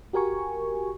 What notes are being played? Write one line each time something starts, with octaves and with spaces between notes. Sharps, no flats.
F#4 G4 A#4 G#5 C#6